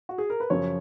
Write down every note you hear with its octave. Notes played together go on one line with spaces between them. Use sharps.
F#4
G#4
A#4
B4
F#2 C#3 F3 C#5